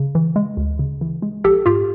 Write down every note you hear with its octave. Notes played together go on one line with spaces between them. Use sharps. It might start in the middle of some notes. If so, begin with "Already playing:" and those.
Already playing: C#3
E3
G#3
D2
C#3
E3
G#3
A#1 G4 A4
G#2 F4 G4